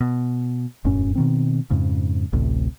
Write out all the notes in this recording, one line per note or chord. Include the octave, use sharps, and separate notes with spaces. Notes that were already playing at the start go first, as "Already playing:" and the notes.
B2
E1 F#2 A2 C#4
B2 D#3 C4
F2 G#2 C#3
A1 D2 A2 C3